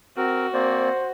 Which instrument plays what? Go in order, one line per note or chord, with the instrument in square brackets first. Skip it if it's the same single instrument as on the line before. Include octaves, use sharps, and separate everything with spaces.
[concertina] C4 A#4 [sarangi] F#4
[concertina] A#3 C4 D5 [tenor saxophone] C5